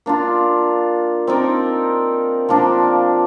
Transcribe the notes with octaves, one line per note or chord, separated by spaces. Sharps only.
A#3 D4 F4
C4 D#4 A#4 D5
F3 A#3 D4